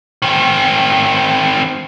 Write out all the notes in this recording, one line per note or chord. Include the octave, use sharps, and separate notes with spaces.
D#3 C4